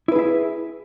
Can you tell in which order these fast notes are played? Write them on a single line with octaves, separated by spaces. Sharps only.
E4 B4 G#4 E5